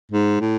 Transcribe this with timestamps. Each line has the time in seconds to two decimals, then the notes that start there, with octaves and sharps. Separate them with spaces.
0.12 G#2
0.40 A2